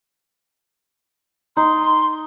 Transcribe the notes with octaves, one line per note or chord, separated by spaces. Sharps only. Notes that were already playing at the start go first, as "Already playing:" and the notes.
D#4 C6